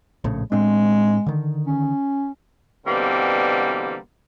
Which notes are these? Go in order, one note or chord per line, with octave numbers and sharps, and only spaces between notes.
A#1 A2 C#3
A2 G#3 C4 D4
D3 D#3
C#4
B2 D3 E3 G3 A#3 C4